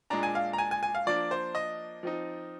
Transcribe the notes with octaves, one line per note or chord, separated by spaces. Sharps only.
A#2 G#3 D4 A#5
G#5
F5
A#5
G#5
G#5
G#5
F5
F3 A#3 D4 D5
C5
D#5
F3 C4 D#4